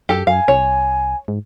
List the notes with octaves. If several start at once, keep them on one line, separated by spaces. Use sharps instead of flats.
F#2 G4 A4
F#2 F5 G#5
C2 C#5
G#2